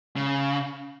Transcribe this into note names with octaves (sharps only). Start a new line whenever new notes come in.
C#3